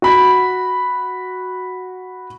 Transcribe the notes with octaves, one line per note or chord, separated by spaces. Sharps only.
F#4 B5